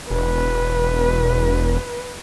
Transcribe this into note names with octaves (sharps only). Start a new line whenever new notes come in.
E1 B4